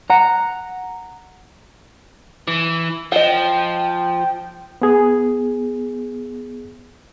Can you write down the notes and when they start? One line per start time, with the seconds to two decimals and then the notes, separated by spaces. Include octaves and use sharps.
0.10 F#5 A#5
2.48 E3
3.12 F3 D#5 F#5 G5
4.82 B3 G#4